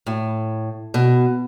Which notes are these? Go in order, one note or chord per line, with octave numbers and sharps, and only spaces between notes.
A2
B2